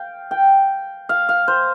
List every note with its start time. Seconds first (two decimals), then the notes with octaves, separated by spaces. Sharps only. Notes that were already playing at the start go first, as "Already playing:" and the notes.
Already playing: F5 G5
0.31 G5
1.09 F5
1.29 F5
1.48 C5